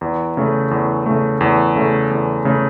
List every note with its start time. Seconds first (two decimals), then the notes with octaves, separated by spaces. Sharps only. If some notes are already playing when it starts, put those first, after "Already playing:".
0.01 E2
0.37 C#3 A3
0.71 E2
1.06 C#3 A3
1.41 E2
1.76 C#3 A3
2.11 E2
2.45 C#3 A3